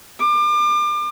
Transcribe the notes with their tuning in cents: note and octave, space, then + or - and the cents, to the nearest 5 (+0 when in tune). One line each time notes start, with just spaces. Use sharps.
D6 +35